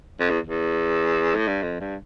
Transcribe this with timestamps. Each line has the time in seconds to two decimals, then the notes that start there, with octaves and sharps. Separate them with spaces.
0.20 F2
0.30 E2
0.47 E2
1.35 A2
1.48 G2
1.62 F2
1.80 G2